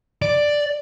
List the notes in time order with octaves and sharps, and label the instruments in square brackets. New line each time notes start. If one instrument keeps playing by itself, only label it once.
[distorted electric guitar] D5